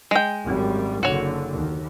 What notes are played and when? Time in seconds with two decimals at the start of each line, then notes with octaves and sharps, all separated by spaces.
0.11 G#3 G5
0.45 G#1 F#2 G3
1.03 F#1 D3 F#4 C#5
1.52 D#2